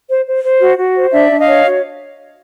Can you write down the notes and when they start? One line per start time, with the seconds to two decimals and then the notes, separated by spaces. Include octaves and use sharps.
0.08 C5
0.26 C5
0.43 C5
0.61 F#4
0.78 F#4
0.96 C5
1.13 D4 D5 E5
1.30 D4
1.39 D#5 F5
1.48 C#5
1.65 F#4